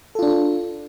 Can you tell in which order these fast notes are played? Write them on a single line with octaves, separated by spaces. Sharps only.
A4 F4 D4